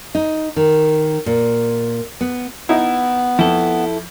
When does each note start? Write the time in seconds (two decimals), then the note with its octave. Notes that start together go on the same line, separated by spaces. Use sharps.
0.15 D#4
0.56 D#3
1.26 A#2
2.21 B3
2.69 B3 D#4 E4
3.39 F2 E4 A4